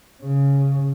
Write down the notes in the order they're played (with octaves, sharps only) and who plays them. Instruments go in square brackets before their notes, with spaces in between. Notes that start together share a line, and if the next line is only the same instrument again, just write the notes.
[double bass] C#3